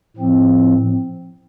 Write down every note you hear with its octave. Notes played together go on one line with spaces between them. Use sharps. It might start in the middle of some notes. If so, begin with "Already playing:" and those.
A2 F3 C4